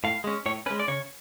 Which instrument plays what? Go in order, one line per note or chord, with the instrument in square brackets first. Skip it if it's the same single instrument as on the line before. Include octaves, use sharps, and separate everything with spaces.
[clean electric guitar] A2 F5
G#3 C#4
A2 C#5
C#4 B4
G#3
D5
C#3 C#5